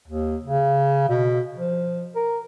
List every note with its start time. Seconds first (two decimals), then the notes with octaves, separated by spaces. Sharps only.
0.08 D#2
0.44 C#3
1.09 B2
1.57 F3
2.16 A#4